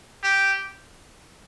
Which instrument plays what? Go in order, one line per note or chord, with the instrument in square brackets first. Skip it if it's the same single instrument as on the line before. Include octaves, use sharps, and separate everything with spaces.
[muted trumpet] G4